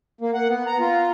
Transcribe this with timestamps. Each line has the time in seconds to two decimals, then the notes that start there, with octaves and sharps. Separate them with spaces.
0.21 A#3
0.34 F#5
0.48 B3
0.67 A#5
0.80 F4